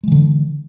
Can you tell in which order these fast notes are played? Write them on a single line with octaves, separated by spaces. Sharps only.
G#3 E3 D3